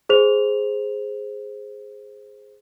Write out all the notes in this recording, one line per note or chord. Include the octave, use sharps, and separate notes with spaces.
G#4 C5 F7